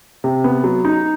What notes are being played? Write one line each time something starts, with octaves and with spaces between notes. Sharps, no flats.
C3
B3
F#3
D#4